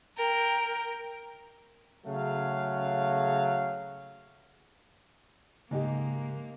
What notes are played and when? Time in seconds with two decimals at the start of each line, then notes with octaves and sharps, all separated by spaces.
0.17 A#4 G5
2.07 C#3 F#3 A3 G#4 F5
5.71 G#2 C#3 A#3 D#4 G4